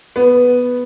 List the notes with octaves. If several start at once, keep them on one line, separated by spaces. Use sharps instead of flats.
B3